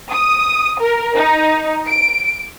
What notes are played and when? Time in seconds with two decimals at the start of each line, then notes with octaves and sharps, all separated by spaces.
0.11 D#6
0.80 A#4
1.15 D#4
1.89 D7